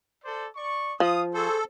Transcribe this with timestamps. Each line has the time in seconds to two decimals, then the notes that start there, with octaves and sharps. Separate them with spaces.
0.24 A4 C5 D5
0.56 D5 C#6
1.00 F3 F5 D#6
1.34 G#4 A4 C5 C#6